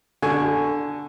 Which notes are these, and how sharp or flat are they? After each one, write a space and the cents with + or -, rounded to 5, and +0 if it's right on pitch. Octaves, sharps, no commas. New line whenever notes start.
D3 +0 G#5 +5 C#6 +0